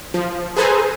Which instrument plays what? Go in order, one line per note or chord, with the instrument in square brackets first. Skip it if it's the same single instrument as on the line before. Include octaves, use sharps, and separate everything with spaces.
[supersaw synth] F3
G#4 A4 B4 C5 G#5 A#5